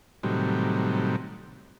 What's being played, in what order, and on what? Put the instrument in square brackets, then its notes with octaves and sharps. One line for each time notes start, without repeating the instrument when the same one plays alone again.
[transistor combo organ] A2 C3 D#3 F#3 G3